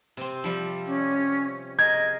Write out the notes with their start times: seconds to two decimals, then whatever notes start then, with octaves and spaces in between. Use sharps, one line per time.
0.17 C3 C4
0.44 F3 G3
0.87 C#4
1.79 G#4 A#4 D#5 G#6